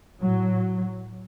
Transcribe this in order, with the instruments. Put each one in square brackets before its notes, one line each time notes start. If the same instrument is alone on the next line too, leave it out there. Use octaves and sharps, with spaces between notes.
[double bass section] A2 F#3